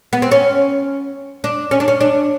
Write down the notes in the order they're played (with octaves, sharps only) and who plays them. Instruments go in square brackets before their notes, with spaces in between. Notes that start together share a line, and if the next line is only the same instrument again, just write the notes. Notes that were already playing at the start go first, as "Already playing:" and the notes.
[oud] B3
C4
C#4
D4
C#4
D4
C#4
D4